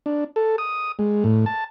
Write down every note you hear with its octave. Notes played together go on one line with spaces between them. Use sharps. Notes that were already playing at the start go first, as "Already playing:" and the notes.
D4
A4
D#6
G#3
A2
A5